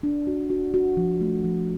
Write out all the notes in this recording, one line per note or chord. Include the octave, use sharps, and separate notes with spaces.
D4
F#4
F#4
F#4
F3
A3
F3